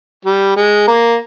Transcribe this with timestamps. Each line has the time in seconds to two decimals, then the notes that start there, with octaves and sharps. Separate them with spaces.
0.25 G3
0.56 G#3
0.88 A#3